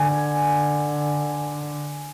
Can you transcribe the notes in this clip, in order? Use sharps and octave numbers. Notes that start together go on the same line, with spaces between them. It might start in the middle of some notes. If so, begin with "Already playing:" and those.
Already playing: D3 G#5